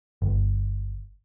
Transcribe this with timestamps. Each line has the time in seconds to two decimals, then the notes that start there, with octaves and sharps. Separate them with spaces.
0.22 G1